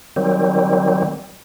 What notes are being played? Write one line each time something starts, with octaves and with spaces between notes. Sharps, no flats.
D#3 F#3 G3 C4